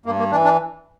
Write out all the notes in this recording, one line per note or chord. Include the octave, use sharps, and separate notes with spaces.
G2 A#3
A#3
E3 D4
D4